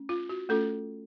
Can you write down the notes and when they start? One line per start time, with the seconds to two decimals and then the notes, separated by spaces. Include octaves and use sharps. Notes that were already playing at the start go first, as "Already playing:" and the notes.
Already playing: A3 C#4
0.09 F4
0.29 F#4
0.49 A3 C#4 F4 A4